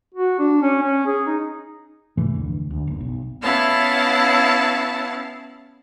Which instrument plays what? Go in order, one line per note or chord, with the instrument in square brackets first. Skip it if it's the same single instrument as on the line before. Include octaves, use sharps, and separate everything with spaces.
[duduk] F#4
D4
C#4
C#4
G#4
D#4
[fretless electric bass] G#2 C3 E3 A3
F1 D2
D2
F#1
B1
[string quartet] B3 C#4 E4 F5 A5